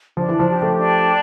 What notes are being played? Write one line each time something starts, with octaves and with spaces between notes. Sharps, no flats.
F3 D4
E3
F3
G4
F3 A3
D4